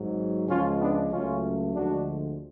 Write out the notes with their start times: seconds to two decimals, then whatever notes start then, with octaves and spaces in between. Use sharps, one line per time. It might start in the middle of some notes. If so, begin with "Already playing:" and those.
Already playing: G#1 G#2 F#3
0.48 C#2 C#3 F3 G#3 C#4 F4
0.79 B3 D4
1.11 C#2 C#3 F#3 A3 C#4 F4
1.74 D2 D3 F3 G#3 D4 F#4